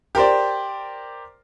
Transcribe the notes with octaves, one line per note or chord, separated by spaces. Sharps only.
G4 A#4 C5 D5